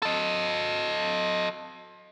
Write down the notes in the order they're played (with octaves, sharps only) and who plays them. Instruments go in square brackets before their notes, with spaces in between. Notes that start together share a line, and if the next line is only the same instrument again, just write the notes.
[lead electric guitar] A4 D#5